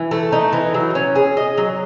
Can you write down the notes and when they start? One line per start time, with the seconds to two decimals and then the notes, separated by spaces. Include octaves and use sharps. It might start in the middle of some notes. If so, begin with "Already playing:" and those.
Already playing: E3
0.11 A3
0.32 D#4
0.53 E3
0.74 F#3
0.95 C#4
1.15 G#4
1.37 D#5
1.58 F#3